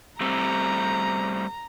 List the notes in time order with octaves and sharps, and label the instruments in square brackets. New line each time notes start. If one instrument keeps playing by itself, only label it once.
[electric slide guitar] G3 A3 C4 [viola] A#5